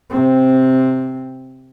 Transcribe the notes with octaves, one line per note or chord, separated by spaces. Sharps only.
C3 C4